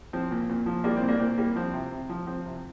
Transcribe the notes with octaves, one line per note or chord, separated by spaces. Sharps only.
F3 C4
A#2
A#2
F3
G3 A#3 D4
C4
A#2
A#3 D4
A#2 C4
G3 A#3
F3 C4
C3
C3
F3
F3 C4
C3